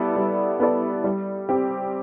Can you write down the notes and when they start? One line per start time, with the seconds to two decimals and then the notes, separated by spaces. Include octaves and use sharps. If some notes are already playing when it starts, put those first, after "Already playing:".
Already playing: G3 B3 E4 A4 D5
0.16 G3
0.60 B3 E4 A4 D5
1.04 G3
1.49 C4 G4